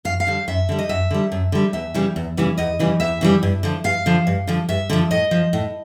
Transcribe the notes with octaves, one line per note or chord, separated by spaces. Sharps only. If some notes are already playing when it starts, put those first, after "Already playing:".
F#2 F5
F5
D3 G3
F#2 E5
D3 G3
D#5
F#2 E5
D3 G3
F#2
D3 G3
E2 E5
C#3 E3 G3
E2
C#3 E3 G3
E2 D#5
C#3 E3 G3
E2 E5
C#3 E3 G3
G2
D3 F3
G2 F5
D3 F3
G2
D3 F3
G2 E5
D3 F3
A2 D#5
F3
A2